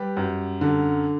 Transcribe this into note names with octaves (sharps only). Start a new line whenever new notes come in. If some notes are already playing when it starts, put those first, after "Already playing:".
Already playing: G3 G4 B4
F#2
D3